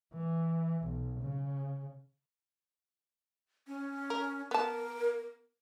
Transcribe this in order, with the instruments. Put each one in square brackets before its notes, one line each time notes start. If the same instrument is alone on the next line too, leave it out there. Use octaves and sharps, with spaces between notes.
[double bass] E3
B1
C#3
[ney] C#4
[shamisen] A#4
[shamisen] B3 A5 [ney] A#4